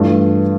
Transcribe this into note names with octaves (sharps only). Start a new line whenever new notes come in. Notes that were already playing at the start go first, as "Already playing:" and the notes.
Already playing: G2 E3 A3 D4 F4